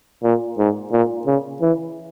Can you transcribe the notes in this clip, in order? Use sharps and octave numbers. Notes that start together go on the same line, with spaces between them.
A#2
G#2
A#2
C#3
E3